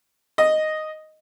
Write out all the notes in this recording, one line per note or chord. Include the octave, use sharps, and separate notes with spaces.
D#5